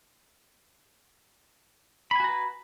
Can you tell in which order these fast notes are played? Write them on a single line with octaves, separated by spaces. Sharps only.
B5 G#5 F#4 A#5 B4